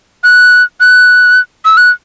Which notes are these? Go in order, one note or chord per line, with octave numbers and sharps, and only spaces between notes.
F#6
F#6
E6
F#6